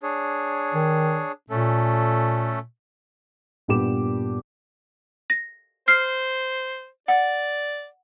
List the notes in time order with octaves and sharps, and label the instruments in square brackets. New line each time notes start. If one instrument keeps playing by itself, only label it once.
[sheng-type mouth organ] D4 G#4 C#5
[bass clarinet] D#3
[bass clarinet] A#2 [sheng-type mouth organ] A3 C#4 A4
[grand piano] G2 A#2 B3 G4 D6 E7
[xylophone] A#6
[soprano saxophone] C5 [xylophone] F6 C7
[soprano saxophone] D5 [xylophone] F#5